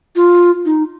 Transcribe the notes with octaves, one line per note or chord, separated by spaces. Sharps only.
F4
D#4